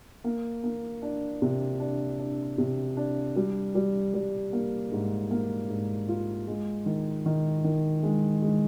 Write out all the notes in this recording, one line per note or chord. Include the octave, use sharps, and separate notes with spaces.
A#3
A#3
D4
C3
D4
D4
C3
D4
G3
G3
G3
A#3
G#2
A#3
G#2
F4
G#3
D#3
D#3
D#3
G#3
G#3